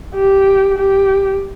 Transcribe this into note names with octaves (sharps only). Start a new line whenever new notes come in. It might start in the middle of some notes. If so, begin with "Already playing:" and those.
G4
G4